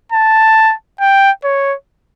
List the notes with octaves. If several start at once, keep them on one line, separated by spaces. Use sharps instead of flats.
A5
G5
C#5